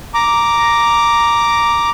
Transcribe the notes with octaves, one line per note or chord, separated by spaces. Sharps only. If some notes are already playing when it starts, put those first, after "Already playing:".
A#5 D6